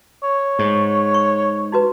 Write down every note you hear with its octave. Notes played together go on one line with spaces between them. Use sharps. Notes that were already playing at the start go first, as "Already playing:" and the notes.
C#5
G#2
C#6
D#4 F#4 B4